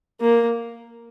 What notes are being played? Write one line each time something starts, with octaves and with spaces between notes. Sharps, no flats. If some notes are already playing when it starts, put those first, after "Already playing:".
A#3